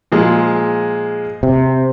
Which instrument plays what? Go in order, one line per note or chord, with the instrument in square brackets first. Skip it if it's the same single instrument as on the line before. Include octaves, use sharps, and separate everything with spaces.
[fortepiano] A#2 F3 G#3
[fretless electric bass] C3